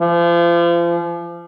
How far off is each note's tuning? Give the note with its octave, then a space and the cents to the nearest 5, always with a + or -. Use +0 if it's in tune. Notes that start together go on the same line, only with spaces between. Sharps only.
F3 -35